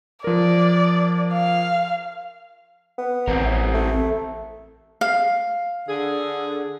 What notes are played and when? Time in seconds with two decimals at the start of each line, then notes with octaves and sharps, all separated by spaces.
0.24 F3 A#4 D5
1.33 F5
2.98 B3
3.28 A1 C4 A#4
3.74 A3
5.01 F5
5.87 D3 G#4